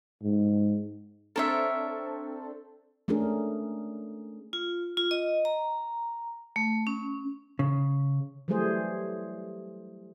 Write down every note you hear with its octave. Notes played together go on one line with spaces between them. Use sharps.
G#2
C4 D4 A4 A#4 C#5 E5
A3 C#4 D4 G#4 A#4
F4
F4
D#5
A#5
A3
C#4
C#3
E3 F#3 G3 A3 G#4 C5